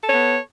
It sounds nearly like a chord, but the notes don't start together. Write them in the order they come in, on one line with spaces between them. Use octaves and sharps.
A4 C#5 B3